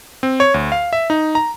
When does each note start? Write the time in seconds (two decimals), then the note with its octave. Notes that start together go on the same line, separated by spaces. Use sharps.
0.23 C4
0.40 C#5
0.54 D2
0.72 F5
0.93 E5
1.10 D#4
1.35 A#5